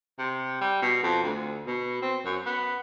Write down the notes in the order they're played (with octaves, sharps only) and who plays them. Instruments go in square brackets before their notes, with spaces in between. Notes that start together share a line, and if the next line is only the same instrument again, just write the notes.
[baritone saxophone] C3
G3
B2
F2
D2
B2
C4
F#2
B3